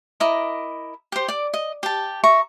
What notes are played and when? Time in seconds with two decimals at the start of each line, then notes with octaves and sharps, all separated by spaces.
0.20 E4 A#4 D#5 D6
1.12 G4 C5
1.28 D5 D6
1.54 D#5
1.83 G4 A5
2.24 E5 A#5 C#6